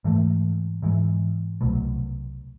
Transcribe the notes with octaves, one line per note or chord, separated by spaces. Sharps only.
G#2 E3 A3
G#2 E3 G#3
C2 B2 F#3 A3